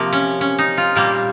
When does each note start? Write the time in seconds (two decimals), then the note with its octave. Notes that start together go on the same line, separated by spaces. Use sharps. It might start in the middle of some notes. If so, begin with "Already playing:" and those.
Already playing: C3 F3 A#3
0.13 C#4
0.41 C#4
0.59 D#4
0.78 F4
0.96 A#2 G3 A#3